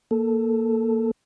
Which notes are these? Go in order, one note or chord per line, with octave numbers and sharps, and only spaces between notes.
A#3 A4